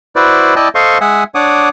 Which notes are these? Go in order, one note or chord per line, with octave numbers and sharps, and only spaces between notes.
E4 F#4 B4 C5 D5
E4 D5 D#5 G5 A5
A4 C5 D#5 F5 C6 C#6
G#3 E5 F#5 G#5 D#6
D4 C#5 F#5 D6 D#6